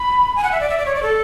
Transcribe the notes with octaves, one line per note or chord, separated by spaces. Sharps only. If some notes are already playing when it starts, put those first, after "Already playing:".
Already playing: B5
G#5
F#5
E5
D5
E5
D5
C#5
D5
A4